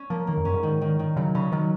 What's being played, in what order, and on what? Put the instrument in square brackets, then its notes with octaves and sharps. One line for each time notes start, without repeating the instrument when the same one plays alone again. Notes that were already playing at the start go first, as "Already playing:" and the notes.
Already playing: [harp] C#4
[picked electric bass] F3 [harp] A#3
[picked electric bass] D#3 [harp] A#3
[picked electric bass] F2
[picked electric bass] F#2 [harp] C#4
[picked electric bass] G#2
[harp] D#3
D#3
D#3
[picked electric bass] C#3 [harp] F#3
[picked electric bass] C#3 [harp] C#4
[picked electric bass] D#3 [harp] F#3